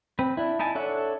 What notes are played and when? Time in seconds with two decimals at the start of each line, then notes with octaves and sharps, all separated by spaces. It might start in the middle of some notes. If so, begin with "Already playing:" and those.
0.19 C4 B4
0.37 D4 E4
0.59 D#4 E4 G#5 A5
0.75 D4 A4 C#5 E5 F#5